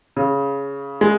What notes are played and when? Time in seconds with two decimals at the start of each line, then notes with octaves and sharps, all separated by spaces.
0.17 C#3
1.01 G#3